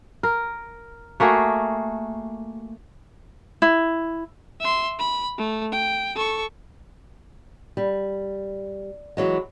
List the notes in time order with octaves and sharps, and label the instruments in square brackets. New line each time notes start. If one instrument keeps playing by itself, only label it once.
[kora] A#4
A3 A#3 F#4 G#4
[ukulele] E4
[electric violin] E5 C6
B5
A3
G5
A4 C#6
[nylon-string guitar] G3
E3 F#3 G#3